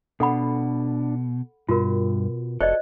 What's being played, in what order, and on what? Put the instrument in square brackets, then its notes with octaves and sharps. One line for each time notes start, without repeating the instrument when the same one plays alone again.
[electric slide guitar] B2 [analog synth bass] D4 [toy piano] A4 F#5 B5
[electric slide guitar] G2 [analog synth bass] B2 [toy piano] F4 F#4 A#4
[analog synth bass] F1 [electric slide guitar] F#4 A4 [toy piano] C5 D5 D#5